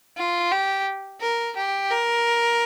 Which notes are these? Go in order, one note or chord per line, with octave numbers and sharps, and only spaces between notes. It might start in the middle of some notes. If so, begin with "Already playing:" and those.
F4
G4
A#4
G4
A#4